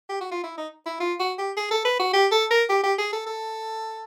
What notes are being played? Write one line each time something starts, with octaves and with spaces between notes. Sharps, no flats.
G4
F#4
F4
E4
D#4
E4
F4
F#4
G4
G#4
A4
B4
F#4
G4
A4
A#4
G4
G4
G#4
A4
A4